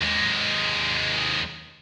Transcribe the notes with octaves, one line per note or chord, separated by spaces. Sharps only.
D#2 G#3